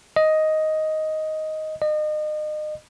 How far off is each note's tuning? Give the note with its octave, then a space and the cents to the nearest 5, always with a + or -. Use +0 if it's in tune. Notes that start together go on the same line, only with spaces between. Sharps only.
D#5 +5
D#5 -35